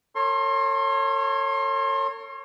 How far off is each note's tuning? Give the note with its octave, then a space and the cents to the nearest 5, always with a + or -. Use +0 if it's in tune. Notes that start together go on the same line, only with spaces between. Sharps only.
A4 +45 C#5 -10 C6 +30